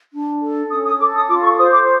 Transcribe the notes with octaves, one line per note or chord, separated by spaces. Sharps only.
D4
A4
C#4 D#6
D#6
A4 D6
D#6
F4 D6
C#6
C5 D#6
D6